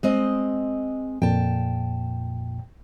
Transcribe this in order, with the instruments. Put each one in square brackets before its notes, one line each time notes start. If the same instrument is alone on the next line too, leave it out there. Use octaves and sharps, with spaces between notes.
[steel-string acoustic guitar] G#3 C4 D#5
[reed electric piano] F2 A#2 [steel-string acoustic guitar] G5 A5